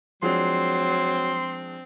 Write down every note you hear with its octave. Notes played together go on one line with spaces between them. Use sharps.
F3 F#3 G#3 C4 D4 C6